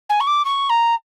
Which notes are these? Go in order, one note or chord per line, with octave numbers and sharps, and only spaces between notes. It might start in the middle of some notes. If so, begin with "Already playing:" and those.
G#5
C#6
D6
C#6
A#5